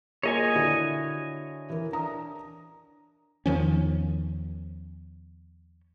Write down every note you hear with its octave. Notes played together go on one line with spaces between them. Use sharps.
A#3 F4 G#4 C#5 D#5 G#5
D3 E4 F#4
E3 A#4
D4 A#5 D#6
E2 D#3 F3 C#4